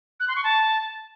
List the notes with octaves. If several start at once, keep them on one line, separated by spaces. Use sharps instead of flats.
F#6
C6
C#6
A5